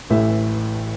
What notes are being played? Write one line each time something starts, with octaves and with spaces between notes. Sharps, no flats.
A1 A2 E3 E5